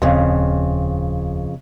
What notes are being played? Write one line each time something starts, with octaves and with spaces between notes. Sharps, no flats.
D#1 F2 C#3